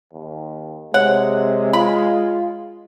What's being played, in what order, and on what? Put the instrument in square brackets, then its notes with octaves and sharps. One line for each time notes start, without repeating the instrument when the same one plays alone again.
[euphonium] D#2
[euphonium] C3 [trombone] G#3 [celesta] C#5 [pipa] F#5
[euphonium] F4 [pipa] B5